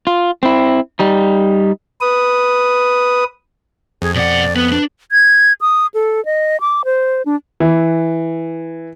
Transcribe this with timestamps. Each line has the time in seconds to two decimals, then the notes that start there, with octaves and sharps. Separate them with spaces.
0.07 F4
0.43 C4 E4
0.99 G3 D#4
2.01 B4 D#6
4.02 F2 G#4
4.15 B2 D5 F#5
4.56 B3 B4
4.72 D4
5.12 G#6
5.61 D#6
5.94 A4
6.25 D#5
6.61 D6
6.85 C5
7.26 D4
7.60 E3